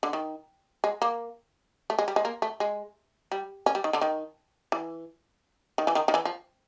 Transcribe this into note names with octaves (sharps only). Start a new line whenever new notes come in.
D3
D#3
G#3
A#3
A3
G#3
G3
G#3
A#3
A3
G#3
G3
C#4
G3
D#3
D3
D#3
E3
D#3
E3
D#3
D#3
E3
F3